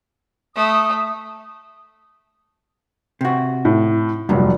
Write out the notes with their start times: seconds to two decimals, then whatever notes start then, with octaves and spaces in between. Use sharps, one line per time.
0.56 A3 D#6
3.21 C3 F#4
3.65 A2
4.29 F1 G2 A#2 F#3